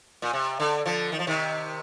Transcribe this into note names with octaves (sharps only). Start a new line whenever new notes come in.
A#2
C3
D3
D3 F3
D#3
F3
C3 D#3